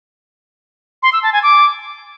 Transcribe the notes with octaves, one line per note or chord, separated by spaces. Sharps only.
C6
E6
A5
G#5
D6